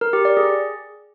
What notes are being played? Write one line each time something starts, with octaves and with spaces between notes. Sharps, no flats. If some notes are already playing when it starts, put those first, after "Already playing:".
A#4
G4
D5
G#4